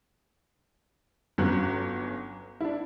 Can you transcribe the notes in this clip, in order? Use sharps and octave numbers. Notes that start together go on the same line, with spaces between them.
G1 F#3 C#4 F#6
D4 E4